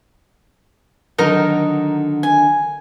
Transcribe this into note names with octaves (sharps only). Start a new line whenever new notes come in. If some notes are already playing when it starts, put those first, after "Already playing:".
D3 D#3 F#3 D#4 A#4 D#5
G#5